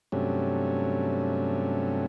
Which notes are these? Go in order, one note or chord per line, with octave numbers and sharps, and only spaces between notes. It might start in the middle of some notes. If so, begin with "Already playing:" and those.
G2 C3 F#3 A3 C#4